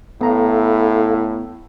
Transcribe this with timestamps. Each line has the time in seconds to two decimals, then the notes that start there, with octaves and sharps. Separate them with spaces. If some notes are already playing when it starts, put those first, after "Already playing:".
0.21 A2 B3 E4 A4 F5 A#5